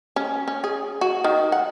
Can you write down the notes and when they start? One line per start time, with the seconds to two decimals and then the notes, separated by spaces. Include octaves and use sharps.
0.16 C#4
0.48 C#4
0.64 G#4
1.01 F#4
1.24 D#3
1.52 F#5